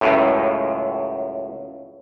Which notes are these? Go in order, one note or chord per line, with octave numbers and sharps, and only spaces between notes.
C#2 F#2 A2